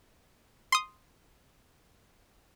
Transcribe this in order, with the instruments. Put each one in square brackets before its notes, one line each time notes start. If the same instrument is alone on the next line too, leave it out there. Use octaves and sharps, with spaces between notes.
[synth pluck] C6 D#6